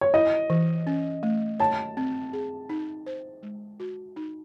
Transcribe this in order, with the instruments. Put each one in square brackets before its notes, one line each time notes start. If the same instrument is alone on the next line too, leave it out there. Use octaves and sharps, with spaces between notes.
[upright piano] C#5
[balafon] E4 [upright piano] D#5
[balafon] E3
C#4
A3
[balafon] C#5 [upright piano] A5
[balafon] C4
G#4
D#4
C5
G#3
F#4
D#4